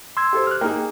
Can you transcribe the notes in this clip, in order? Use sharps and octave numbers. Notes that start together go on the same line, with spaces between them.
C6 E6 G#6
G4 A4 C5
F6 F#6
A#3 D#4 G#4 G5